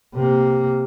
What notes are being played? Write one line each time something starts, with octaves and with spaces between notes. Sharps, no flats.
C3 A#3